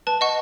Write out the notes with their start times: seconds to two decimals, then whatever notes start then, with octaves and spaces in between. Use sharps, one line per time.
0.07 B4 A5
0.21 D#5 F#5 C#6